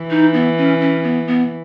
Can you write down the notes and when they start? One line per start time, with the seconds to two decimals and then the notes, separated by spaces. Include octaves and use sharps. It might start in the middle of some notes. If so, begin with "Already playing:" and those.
Already playing: E3
0.11 D#4
0.34 B3
0.58 C#4
0.81 C#4
1.03 B3
1.27 B3